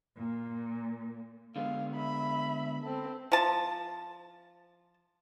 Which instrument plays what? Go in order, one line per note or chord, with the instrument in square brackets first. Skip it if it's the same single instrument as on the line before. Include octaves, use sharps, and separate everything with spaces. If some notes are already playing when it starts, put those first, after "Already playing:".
[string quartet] A#2
[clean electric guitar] D3 G#3 B3 [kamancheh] F5
[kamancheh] E5 B5
C4 A4
[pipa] F3 A5